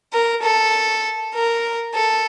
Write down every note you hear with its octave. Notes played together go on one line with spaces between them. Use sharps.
A#4
A4
A#4
A4